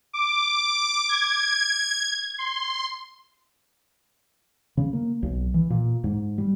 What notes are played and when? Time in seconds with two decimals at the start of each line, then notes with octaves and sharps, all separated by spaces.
0.13 D6
1.09 G#6
2.38 C6
4.77 C#3
4.93 A#3
5.23 B1
5.54 E3
5.70 A#2
6.04 G#2
6.38 G3